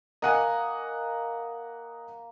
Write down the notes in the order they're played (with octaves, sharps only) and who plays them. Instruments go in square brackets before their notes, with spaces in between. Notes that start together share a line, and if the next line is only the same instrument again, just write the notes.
[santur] A#3 [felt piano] D#5 F#5 G#5